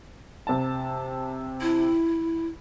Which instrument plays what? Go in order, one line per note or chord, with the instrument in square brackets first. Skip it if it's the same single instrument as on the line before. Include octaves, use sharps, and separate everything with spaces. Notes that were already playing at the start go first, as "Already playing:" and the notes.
[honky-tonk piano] C3 A5
[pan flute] E4